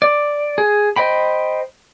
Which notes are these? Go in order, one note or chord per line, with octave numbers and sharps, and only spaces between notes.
D5
G#4
C5 D#5 G5 B5